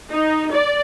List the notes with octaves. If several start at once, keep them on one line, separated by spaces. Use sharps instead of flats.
D#4
D5